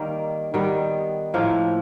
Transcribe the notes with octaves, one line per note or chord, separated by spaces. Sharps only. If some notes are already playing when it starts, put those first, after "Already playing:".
Already playing: D#3 G3 A#3
D#3 G3 B3
A2 F3 A#3